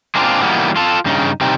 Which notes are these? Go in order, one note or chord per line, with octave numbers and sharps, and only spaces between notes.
G#3 A#3 C4 D4 D#4 F4
E3 F#3 G3 A#3 B3 D#4
F4 A4
G2 C#3 D#4
C3 D#3 G3 C4 D#4